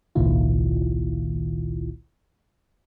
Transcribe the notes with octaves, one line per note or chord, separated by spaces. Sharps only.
G#1 C#2 A#2 D#3 E4 F4